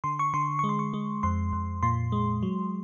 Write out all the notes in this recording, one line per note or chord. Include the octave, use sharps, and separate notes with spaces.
D3 C6
C#6
D3 C6
G#3 C#6
C6
C#6
G#3
F2 C6
F2
A#2 C6
G#3
F#3